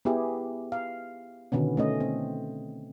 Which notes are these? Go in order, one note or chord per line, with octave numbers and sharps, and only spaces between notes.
B3 E4 G4 G#4
F5
B2 D3 D#3 B3 C#4
A3 C#4 D#5
C4